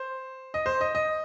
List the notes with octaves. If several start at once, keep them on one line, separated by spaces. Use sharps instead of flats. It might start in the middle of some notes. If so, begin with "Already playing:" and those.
Already playing: C5
D#5
C5
D#5
D#5